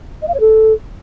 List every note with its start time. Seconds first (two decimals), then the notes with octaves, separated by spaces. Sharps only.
0.22 D#5
0.28 F5
0.34 C#5
0.40 A4